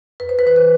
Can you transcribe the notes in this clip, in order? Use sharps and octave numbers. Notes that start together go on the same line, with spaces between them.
F2 B4
C5
B4
E3 C5
B4